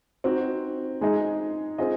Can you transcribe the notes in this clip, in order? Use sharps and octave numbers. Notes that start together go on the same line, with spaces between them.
C4 D#4 F#4
G#3 D#4 G#4 D#5
C4 F4 G#4 D#5